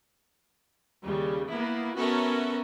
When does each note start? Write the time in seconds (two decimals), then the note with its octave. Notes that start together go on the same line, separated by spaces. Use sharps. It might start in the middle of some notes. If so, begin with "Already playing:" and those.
1.05 D#2 C#3 G3
1.50 A#3 B3 E4
1.97 B3 C#4 F#4 A4 A#4 E5